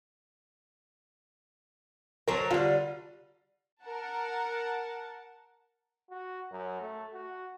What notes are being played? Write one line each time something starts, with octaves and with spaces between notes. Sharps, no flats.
F#3 A#4 C5 C#5 A5
D3 G3 F4
A#4 F#5 A5
F#4
F#2
A3
F#4